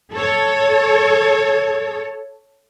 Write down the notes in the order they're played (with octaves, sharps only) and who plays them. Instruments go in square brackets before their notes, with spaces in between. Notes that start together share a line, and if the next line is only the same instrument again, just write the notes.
[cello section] A4 C#5